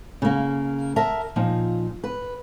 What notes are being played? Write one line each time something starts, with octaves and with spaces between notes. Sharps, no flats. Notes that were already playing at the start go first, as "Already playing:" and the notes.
C#3 A#3
A#4 E5 A5
A#2 F3 D#4
B4